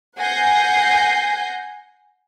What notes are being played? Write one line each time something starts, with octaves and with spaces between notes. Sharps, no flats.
F#5 G#5 G6 A#6 C7